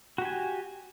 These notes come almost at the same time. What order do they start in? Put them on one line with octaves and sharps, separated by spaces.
F#4 G4 G#5